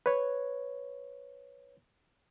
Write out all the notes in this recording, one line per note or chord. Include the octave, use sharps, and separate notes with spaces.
B4 C#5